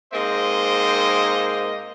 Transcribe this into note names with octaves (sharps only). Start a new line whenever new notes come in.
G#2 A#3 C4 C5 D#5